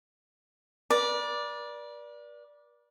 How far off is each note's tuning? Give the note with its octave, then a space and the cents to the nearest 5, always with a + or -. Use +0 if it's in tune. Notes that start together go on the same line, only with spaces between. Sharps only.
B4 -45 D5 +0